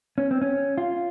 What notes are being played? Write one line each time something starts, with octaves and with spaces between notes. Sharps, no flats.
C#4
C4
C#4
F4